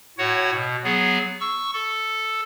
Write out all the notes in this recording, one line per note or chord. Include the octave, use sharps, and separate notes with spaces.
A2 F#4 C#5 F#5
B2
F#3 B3 G#4
C#6 E6
A4